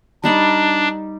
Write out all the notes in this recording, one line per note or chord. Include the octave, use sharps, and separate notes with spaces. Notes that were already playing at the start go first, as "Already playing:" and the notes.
G3 D4 D#4 D5